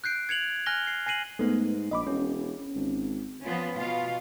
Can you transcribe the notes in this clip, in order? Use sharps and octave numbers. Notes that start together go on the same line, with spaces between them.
F#6 G6 C7 D7
G#6 C#7 F7 F#7
G#5 F6 F#6 A#6 G7
C7
G#5 A#6 C7 D#7 F#7
G#2 A3 B3
A#1 D#5 B5 D6
E1 C#4
G#1
F3 B3 C#4 F4
B2 F4 F5